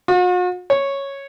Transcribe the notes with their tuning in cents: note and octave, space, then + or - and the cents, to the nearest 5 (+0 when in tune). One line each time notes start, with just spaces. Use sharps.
F#4 -45
C#5 -5